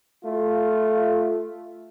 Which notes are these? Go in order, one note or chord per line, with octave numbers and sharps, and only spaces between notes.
A3 F4